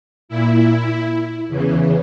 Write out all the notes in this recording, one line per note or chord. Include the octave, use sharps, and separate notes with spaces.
A#2 E4
E2 C#3 E3